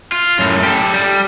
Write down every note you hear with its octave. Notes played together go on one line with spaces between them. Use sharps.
F4
F#2 A2
G4 A4
G3